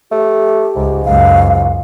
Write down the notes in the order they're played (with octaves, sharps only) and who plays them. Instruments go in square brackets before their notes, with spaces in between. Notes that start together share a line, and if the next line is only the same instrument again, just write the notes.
[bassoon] A3 [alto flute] G4
[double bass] C#2 [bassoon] G#2
[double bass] C#2 F#2 [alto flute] F5